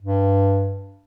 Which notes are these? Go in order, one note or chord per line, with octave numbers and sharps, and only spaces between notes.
G2